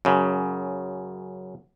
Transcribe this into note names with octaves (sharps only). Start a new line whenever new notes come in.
F#2 C#3